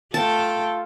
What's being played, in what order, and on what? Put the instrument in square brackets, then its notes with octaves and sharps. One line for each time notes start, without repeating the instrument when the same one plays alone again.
[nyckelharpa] A3 G5 [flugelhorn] F4 [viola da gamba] A4 [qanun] A5